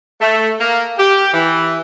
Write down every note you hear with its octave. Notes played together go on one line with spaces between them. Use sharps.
A3
A#3
G4
E3